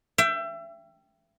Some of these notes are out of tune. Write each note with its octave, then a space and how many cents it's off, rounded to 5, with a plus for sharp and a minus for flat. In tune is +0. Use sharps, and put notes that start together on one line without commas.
E5 +30 G5 +0